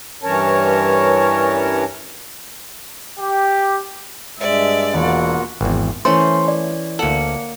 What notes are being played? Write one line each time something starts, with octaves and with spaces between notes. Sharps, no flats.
G2 E3 C#4 A#4 C#5 A5
G4
G2 G#3 D5 E5
E1 A#3 F4 F#4 F#5
G#1 E2
E3 A3 C#4 C5 C6
D5
D2 A#3 A4 F#5